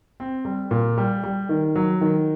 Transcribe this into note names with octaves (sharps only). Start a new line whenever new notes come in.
C4
G3
A#2
G3
G3
D#3
F#3
D#3